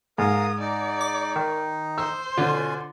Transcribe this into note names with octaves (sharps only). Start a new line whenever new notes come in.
G#2 A#4 F5 D#6
D#4 D5
D6
D#3
C5 E6
B2 D3 C#4 F4 G#5